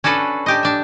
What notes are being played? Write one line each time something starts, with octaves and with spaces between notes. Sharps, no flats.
C#4 D4 F#4 A4 B4
D4 G4 D#5
D4 E5